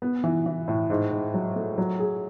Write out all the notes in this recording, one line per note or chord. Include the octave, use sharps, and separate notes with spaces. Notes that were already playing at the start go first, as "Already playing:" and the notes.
B3
E3
E3
A2
G#2
G#2
F#3
A3
F#3
G#4